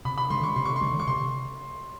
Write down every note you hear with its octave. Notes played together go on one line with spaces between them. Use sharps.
C3 B5
B5
D#3 G#3 C6
C#6
C3 C6
C#6
C6
D#3 G#3
C#6
C3 C6